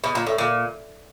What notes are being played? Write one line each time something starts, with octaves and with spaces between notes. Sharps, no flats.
B2
A#2
A2
A#2